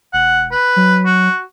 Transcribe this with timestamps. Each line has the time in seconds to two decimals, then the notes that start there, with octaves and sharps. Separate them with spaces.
0.13 E1 F#5
0.52 B4
0.76 F#3
1.06 F#4